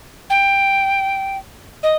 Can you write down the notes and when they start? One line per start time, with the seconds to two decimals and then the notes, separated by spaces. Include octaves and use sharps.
0.30 G5
1.83 D#5